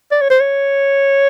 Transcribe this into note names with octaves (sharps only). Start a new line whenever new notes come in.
D5
C#5
C5
C#5